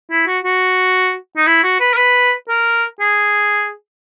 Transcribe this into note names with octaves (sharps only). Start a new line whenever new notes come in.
E4
F#4
F#4
D#4
E4
F#4
B4
A#4
B4
A#4
G#4